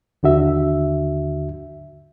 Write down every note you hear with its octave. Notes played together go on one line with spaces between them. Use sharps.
D#2 D3 F#4 E5